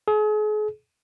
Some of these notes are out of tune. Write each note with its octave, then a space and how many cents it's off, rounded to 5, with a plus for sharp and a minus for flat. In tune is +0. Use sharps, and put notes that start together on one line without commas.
G#4 +40